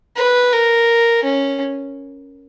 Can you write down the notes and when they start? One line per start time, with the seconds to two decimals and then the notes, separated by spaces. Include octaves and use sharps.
0.17 B4
0.53 A#4
1.24 C#4